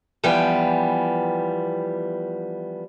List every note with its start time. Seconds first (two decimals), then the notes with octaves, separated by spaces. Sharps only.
0.24 E3 F3 G3 B3 G5 G#5